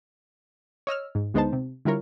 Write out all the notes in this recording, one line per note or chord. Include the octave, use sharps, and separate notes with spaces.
C#5 D#5 E6 F6
G#2
D2 G#3 B3 D#4 C5 A5
C3
D3 G3 E4 F4 A#4 C#5